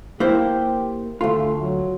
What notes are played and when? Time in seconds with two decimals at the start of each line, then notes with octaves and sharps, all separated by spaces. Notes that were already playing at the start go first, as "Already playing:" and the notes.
0.20 A#3 E4 G4 C5
1.21 D2 A3 F4
1.61 F#3